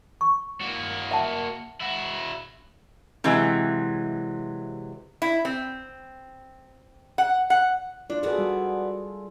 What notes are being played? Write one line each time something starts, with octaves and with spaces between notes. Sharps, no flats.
C#6
A#3 F#4
E5 F#5 A5
E4 F#4
C3 E3 F#3 G#3
E4
C4
F#5
F#5
D4 F4 D5
B3 F#4 G#4 A4 D5
G3